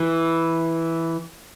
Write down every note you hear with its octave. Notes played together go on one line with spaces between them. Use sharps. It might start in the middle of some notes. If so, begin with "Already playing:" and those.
Already playing: E3